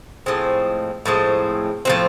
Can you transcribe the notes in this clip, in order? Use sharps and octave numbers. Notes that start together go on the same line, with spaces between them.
A2 F3 G#3 C4
A2 F3 G#3 C4
A2 F3 G#3 C4